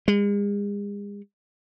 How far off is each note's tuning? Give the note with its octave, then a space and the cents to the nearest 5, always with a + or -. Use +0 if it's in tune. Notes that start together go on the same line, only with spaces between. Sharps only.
G#3 -40